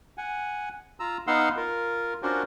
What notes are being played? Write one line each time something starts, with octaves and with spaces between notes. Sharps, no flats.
F#5 G#5
F4 A#5 E6
B3 D#4 F5 F#5 C6 E6
F4 A#4
C#4 D4 F4 F#4 A#4 C5